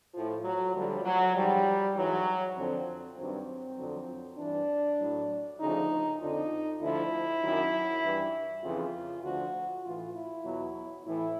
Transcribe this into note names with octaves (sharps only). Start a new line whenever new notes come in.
A2 F3
F#3
D2 D3 F3 G3
F#3
G#2 F3 G3
G#2 E3 F#3
F2 D3 F3 C4
G2 D#3 F#3 C4
F2 D3 F#3
G2 E3 D4
A2 F#3
D2 C#3 F3 D#4
F2 D3 F3 D#4
D2 D3 F3 E4
F#2 D#3 F#3
G2 E3
F2 C#3 E3 F4
D2 D3 F3 F#4
A2 E3 F4
E4
E2 B2 F#3
A2 E3 E4